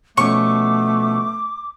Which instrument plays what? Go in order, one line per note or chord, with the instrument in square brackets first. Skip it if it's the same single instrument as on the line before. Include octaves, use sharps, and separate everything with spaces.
[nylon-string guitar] B2 F3 C#4 [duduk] A3 [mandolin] C#6 [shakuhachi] D6